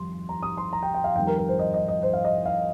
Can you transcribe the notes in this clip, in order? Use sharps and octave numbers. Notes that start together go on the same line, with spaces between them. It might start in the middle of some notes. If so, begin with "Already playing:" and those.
Already playing: F2 D#3 G3 C6
A#5
D#6
C6
A#5
G5
G5
F5
F2 D#3 G3 G5
A#4
A#4
C5
D#5
D#5
D#5
C5
F5
D#5
F5